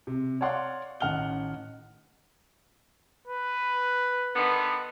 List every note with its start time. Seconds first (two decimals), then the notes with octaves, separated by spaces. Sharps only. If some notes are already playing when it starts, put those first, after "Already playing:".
0.07 C3
0.41 C#5 D5 F5 F#5 C6
1.00 A1 D#3 F#5 F6 G7
3.28 B4
4.36 D3 D#3 B3